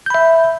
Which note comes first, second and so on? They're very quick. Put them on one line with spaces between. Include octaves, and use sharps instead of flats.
G6 B5 E5